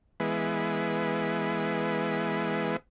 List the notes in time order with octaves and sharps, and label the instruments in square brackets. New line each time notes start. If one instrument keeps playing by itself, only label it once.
[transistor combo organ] E3 G#3 B3